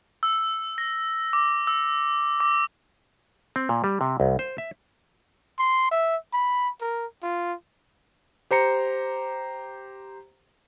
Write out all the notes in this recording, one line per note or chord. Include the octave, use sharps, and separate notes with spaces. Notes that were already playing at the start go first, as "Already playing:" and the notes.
E6
A#6
D6
E6
D6
C4
A#2
G3
C3
C2
C5
E5
C6
E5
B5
A#4
F4
G4 C5 A#5 C#7